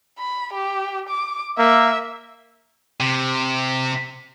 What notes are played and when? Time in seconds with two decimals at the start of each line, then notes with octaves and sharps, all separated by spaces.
0.19 B5
0.53 G4
1.09 D6
1.58 A#3 E5
3.00 C3